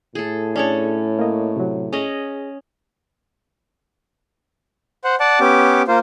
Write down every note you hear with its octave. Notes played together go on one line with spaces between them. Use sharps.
A2 G#4 A4
C#4 D4 G#4 A4 C#5
A#3 D#5
C3 F#3
C#4 G#4 D#5
C5 F#5
D5 F#5 A5
B3 C#4 G4 D6
A#3 F4 C5